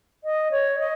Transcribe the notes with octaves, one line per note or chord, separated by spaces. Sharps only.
D#5
C#5
D#5